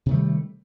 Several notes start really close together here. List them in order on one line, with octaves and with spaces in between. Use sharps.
C3 D#3 A3 G3